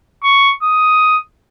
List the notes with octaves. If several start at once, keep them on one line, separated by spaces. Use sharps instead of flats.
C#6
D#6